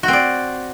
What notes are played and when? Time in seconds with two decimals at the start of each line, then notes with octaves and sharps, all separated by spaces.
0.03 F#4
0.08 C4
0.13 D5